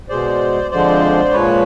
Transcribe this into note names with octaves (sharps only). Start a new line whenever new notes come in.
B2 G#3 C5 D5
F2 D3 F3 G#3 C5 D5
A#2 F3 G#3 B4 C#5